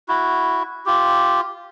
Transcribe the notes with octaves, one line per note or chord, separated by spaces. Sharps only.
E4 F#4
F4 G4